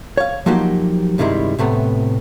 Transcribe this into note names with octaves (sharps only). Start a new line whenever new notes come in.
C#5 F5
F3 F#3 A#3 D#4 F#4 G4
G2 C3 D#3 G3 G#3 E4
A2 C3 A3 B3